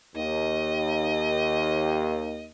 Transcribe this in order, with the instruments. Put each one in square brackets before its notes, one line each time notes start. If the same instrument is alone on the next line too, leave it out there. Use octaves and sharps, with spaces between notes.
[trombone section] D#2 [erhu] D#5